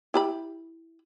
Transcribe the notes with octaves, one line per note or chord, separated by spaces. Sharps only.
E4 G4 B5